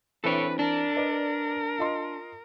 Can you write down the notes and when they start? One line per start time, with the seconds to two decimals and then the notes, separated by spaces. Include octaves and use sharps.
0.24 E3 C4 D4 A4 B4 C#5
0.59 D4 A#4
0.96 B4 D5 D#5
1.79 F4 D#5 C6